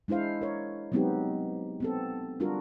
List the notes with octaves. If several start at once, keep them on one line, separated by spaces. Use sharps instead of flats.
G#3 D4 E4 C5 F5
A#4 C#5
F#3 G#3 B3 C4 D#4 G4
B3 C4 A4
G3 D4 F4 F#4 A#4